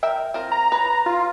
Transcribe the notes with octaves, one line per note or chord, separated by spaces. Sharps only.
A#4 E5 G5
C4 F4 A#4
A#5
B4 C#5
F4